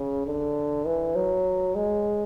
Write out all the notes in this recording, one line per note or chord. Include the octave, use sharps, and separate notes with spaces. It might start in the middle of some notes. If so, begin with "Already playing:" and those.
Already playing: C#3
D3
E3
F#3
G#3